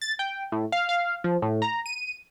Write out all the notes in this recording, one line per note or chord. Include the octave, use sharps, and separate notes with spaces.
A6
G5
A2
F5
F5
F3
A2
A#5
D#7